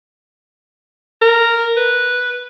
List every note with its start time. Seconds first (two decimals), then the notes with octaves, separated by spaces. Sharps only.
1.22 A#4
1.77 B4